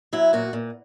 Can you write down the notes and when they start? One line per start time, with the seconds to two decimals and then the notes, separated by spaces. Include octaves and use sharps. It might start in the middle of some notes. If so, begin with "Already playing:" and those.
0.13 F#3 E4
0.33 A#2 F#4
0.53 A#2